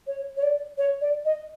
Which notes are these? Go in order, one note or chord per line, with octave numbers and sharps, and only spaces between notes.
C#5
C#5
D5
C#5
D5
D#5